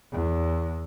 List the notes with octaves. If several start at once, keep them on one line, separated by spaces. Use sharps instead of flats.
E2